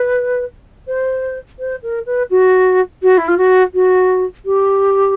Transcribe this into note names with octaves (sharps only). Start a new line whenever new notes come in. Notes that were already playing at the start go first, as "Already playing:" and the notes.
Already playing: B4
C5
C5
A#4
B4
F#4
F#4
E4
F4
F#4
F#4
G4